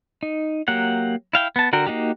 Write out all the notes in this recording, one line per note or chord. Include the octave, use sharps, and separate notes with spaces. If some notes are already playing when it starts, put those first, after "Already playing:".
D#4
F#3 A#3 G4 F#5
E4 F5 G5
B3 A5
D3 F#4 A#4 G5
A#3 D#4 F#4 G4